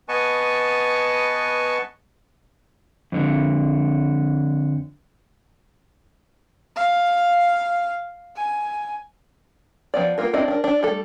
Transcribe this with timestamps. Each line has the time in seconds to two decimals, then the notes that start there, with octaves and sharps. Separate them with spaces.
0.09 B3 B4 D#5 G#5 A5 C#6
3.12 F2 D3
6.76 F5
8.36 G#5
9.94 F3 B3 D5
10.18 A#3 B3 F4 A#4
10.33 C4 D4 E4 D5 D#5
10.48 D4 A#4
10.64 D4
10.83 G3 A3 A4